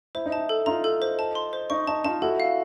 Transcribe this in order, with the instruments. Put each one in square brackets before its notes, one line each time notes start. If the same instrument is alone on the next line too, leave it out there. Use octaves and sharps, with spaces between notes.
[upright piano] E4 [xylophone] C5
[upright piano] D#4
[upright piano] E4 [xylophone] A5
[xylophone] A4
[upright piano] D#4 F4 [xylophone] A#5
[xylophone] A4
C5
A5
C6
C5
[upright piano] D#4 [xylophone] C#6
[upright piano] D#4 [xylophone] A5
[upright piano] D#4 F4 [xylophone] A5
[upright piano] E4 F#4 [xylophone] A4
[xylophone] F5